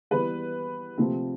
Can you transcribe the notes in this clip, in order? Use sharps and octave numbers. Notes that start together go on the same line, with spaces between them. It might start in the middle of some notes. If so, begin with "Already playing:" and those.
E3 G3 B3 B4
C3 F3 A3 C4